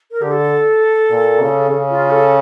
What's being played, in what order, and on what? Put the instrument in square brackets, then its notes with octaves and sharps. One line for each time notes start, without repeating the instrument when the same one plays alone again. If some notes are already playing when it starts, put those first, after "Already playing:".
[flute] A#4
[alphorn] D3 [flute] G4
[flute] A4
[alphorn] A#2
C#3
C#3
[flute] F4
A4